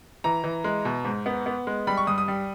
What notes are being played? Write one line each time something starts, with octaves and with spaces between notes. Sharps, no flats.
E3 A#5
E3
G#3
B2
G#2
B3
B3
G#3
G3 B5
C#6
G2 D#6
D#6
G3